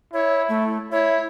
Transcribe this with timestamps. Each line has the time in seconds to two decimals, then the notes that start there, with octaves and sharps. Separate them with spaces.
0.14 E4 C#5
0.49 A3
0.92 E4 C#5